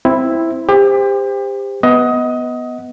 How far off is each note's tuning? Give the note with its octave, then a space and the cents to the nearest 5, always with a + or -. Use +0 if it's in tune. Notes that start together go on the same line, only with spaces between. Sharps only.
C4 +0 E4 +0
G4 +30 C5 -10
B3 +0 D#5 +20 F#5 +0